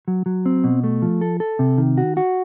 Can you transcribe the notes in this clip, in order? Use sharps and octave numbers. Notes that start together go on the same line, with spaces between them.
F#3
F#3
C4
B2
A3
F3
A4
A4
C3
D#3
F#4
F#4